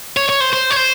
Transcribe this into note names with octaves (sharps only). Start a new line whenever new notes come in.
C#5
C#5
C5
C5
C#5
C5